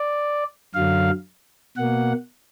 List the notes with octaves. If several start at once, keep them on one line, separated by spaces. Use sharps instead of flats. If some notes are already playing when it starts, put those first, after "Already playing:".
Already playing: D5
F#2 D3 F#3 F5
B2 A#3 F#5